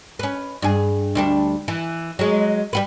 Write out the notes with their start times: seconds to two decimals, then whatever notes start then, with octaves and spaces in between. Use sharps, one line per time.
0.19 C#4 B4
0.62 G2 G#4
1.15 D2 G3 D4
1.68 E3
2.19 F#3 G#3
2.73 G3 F#4 B4